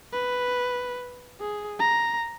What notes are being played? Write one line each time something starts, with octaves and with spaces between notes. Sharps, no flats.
B4
G#4
A#5